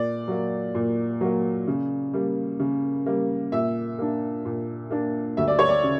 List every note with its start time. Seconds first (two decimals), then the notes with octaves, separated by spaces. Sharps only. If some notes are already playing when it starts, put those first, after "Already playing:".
Already playing: A#2 D5
0.28 F#3 A#3
0.75 A#2
1.21 F#3 A#3
1.67 C#3
2.13 G3 A#3
2.60 C#3
3.06 G3 A#3
3.52 A#2 E5
3.99 A#3 D4
4.45 A#2
4.91 A#3 D4
5.37 D2 E5
5.48 D5
5.59 C#5
5.69 D5
5.84 C#3